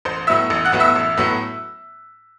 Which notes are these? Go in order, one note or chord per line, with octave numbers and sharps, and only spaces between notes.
A1 C5 C6
A2 F#3 B3 E4 E5 E6
A1
F#5 F#6
A2 F#3 B3 E4
E5 E6
A1
A2 F#3 B3 E4